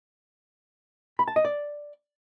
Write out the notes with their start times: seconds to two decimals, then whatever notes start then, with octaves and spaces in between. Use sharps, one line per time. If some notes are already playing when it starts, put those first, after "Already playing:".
1.19 B5
1.28 A5
1.36 D#5
1.45 D5